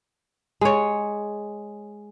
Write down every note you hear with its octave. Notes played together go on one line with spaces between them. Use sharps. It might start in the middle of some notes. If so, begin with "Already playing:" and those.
G#3 C#5